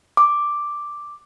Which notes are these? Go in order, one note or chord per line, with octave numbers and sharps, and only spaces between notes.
D6